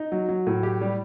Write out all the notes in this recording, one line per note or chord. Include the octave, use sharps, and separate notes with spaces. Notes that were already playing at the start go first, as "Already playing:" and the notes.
Already playing: D#4
F#3
F#3
A2
G4
G3